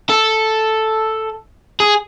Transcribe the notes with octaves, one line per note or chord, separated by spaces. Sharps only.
A4
G#4